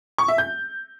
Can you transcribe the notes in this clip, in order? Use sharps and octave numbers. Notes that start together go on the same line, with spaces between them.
C#6
E5
G6